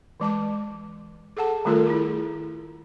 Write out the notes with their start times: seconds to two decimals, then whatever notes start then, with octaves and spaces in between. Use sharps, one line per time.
0.20 E3 G#3 A5 D6
1.37 G#4 A4 F#5 A5
1.65 D#3 G3 A3 F4 A4 A#4
1.87 E4 G#4